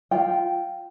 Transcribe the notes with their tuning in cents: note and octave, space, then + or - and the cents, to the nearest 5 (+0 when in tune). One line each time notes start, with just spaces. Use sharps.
F4 +0 G5 -10